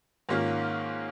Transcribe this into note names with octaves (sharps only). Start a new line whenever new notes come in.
G#2 D#3 A#3 C#4 F4